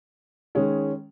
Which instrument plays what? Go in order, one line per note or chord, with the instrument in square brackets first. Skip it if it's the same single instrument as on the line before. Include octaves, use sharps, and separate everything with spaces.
[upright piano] D#3 G#3 C#4